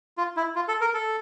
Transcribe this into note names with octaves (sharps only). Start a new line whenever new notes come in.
F4
E4
F4
A4
A#4
A4